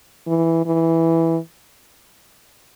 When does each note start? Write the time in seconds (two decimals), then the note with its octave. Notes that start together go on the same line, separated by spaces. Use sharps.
0.27 E3
0.66 E3